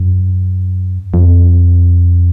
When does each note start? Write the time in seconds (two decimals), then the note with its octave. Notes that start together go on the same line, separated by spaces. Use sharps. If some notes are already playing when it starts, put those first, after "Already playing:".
Already playing: F#2
1.14 F2